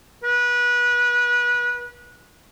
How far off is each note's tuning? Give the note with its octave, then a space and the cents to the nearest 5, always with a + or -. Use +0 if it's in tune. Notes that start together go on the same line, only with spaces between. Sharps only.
B4 -25